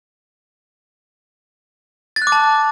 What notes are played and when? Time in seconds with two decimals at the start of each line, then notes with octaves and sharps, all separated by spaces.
2.16 A6
2.22 F#6
2.27 D6
2.32 A5